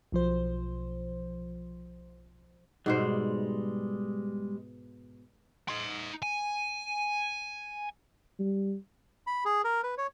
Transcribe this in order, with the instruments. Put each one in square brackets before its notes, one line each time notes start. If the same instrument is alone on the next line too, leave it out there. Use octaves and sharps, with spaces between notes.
[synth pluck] B1 F3 C5
[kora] G#2 B2 C5 [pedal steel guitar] G3 G#3
[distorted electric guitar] D#4 C6
G#5
[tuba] G3
[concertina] B5
G#4
A#4
B4
C#5